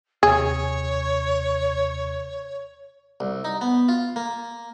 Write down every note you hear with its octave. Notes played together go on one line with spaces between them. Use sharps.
D#2 C3 G#4 C#5
C2
D#4
B3
F4
A#3